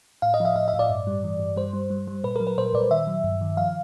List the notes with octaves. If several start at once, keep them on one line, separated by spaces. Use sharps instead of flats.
A2 F5
D#5
F3 E5
A2 F5
E5
A2
D5
G2
G3
E3
G2
G3 C5
G3
G3
G3
A#2 B4
F#3 A#4
B4
A#2 C5
A#2 D5
D#3 E5
F#3
G2
D#3
F3 F5